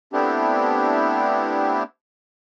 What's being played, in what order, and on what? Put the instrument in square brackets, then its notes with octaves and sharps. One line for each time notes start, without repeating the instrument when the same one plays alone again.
[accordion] A3 B3 C4 D4 E4 G4